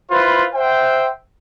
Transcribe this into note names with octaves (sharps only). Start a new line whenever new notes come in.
E4 F4 B4 C5
C5 E5 F#5 G5